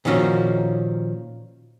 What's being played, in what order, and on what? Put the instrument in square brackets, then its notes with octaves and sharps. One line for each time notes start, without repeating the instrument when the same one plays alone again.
[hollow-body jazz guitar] A#2 D#3 F3 C#4 F#4